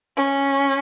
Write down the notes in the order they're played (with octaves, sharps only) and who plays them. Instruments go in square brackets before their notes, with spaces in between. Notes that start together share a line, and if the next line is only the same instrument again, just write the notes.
[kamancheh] C#4